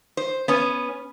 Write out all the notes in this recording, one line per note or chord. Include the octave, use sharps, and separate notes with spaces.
C5
B3 C#4